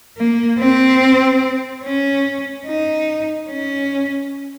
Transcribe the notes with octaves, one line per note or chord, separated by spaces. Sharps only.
A#3
C4
C#4
D#4
C#4